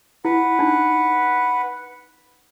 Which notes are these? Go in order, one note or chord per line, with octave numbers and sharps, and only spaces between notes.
E4 B4 F#5
D4 D#4